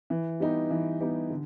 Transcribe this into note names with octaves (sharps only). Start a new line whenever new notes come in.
E3
G3 B3 D#4 G4
E3
G3 B3 D#4 G4
D3